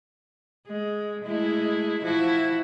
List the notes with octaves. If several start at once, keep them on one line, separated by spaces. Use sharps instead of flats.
G#3
G#3 A3 E4
F3 E4 F#4